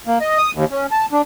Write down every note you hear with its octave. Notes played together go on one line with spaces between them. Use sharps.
A#3
D#5
D#6
D#2
C#4
A5
D4